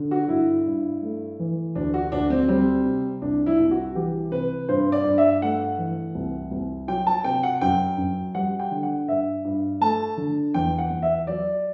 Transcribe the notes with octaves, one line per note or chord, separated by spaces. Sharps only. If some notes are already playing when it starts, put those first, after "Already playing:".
Already playing: D3
F#4
G2 E4
G2
A3
E3
D2 D4
F#4
D2 D4
C4
G3 C4
C3
C2 D4
E4
C2
F#4
E3 G4
C3 B4
G2 C5
D5
G2
E5
A3 F#5
E3
C2
C2
F#3 G5
A5
C3 G5
F#5
F#2 G5
F#2
G3 F#5
G5
D3
F#5
G2 E5
G2
A3 A5
D3
E2 G5
F#5
E2
E5
F#3 D5